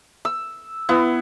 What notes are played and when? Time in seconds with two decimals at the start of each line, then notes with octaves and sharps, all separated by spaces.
0.25 E6
0.89 B3 E4